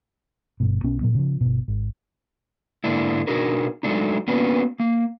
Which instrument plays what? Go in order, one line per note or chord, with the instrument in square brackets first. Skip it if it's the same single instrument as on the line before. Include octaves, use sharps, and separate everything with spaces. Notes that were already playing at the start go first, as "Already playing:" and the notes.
[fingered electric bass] G1 G2 B2
B1 B2 B3 C#4
A#2 F#3 B3
C#3 F3
G1 B2
G#1
[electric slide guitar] G#2 D3 A#3 D4 E4
B2 D4 D#4 F#4 G#4 A#4
F#3 G#3 A3 D4 D#4
A#3 B3 C#4 D4 F#4 B4
A#3